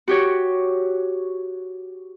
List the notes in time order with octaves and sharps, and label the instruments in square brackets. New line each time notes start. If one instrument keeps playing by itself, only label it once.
[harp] F#4 G4 C#5